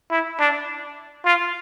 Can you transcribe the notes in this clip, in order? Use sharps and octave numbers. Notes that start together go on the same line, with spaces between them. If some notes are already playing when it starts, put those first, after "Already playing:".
E4
D4
F4